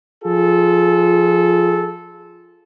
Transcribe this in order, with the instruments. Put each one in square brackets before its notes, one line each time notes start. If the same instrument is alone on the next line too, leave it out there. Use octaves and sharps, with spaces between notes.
[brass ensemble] F3 F4 G#4 A4